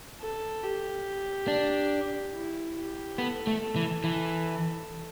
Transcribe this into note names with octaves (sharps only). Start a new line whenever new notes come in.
A4
G4
D4
E4
G4
B3 A4
A3
A4
E3
E3